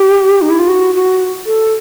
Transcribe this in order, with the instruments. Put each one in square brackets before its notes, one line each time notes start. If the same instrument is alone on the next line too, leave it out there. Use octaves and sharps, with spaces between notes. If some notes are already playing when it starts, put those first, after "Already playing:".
Already playing: [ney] G4
D#4
E4
F4
F#4
F#4
A4